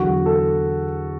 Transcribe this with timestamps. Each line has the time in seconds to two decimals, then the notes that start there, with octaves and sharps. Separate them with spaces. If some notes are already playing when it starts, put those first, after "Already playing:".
Already playing: E2 D3 F#3 F#4
0.26 A4